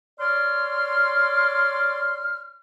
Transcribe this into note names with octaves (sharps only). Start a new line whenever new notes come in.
C#5 D5 C6 F6